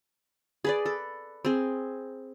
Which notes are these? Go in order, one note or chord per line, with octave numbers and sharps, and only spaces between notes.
G#4 B4 D5
A4
C4 G#4